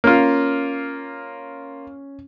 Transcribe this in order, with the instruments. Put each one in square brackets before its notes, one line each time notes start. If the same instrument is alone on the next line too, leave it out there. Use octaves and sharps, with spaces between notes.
[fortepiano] A#3 F4 [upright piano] C#4